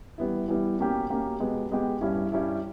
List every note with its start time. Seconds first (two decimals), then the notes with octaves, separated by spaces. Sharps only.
0.18 E3 G3 B3 E4
0.48 E3 G3 B3 E4
0.79 B2 A#3 C#4 G4
1.10 B2 A#3 C#4 G4
1.40 B2 G#3 B3 G4
1.71 B2 G#3 B3 G4
2.01 G2 G3 C#4 E4
2.32 G2 G3 C#4 E4